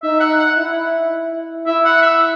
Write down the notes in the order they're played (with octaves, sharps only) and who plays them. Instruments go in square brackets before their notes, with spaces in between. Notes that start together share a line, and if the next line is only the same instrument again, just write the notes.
[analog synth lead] D#4 [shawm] E5
[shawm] F#5
F#5
[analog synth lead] E4
[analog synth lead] E4 [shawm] E5
[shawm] F#5
E5